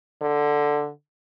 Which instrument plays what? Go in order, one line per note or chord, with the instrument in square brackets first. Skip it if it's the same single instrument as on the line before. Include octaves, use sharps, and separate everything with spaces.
[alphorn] D3